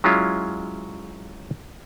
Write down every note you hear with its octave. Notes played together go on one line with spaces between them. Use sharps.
F#3 G#3 C#4 E4 F4